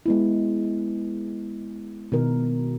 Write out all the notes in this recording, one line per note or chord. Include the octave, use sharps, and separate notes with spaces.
G#3 B3 E4
B2 D#3 A#4